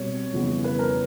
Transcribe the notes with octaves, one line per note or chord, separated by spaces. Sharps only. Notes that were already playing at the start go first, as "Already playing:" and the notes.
Already playing: B2 G3 C4 C#5
F2 C#3 E3 G3 B3
B4
A#4